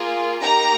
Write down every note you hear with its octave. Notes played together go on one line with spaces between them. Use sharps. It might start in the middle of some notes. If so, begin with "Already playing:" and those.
Already playing: A#3 F4 G#4
A#3 D#4 G4 A#5